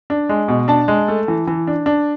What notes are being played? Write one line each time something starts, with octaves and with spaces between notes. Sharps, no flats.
D4
G#3
B2
D4 A5
G#3
A3
E3
E3
D4
D4